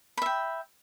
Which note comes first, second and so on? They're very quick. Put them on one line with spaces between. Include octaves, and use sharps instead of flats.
B5 E5 G5